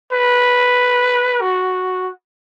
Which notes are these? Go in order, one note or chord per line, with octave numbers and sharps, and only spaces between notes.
B4
F#4